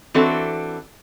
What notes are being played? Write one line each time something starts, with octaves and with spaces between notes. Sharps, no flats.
E3 C4 D4 F#4 A4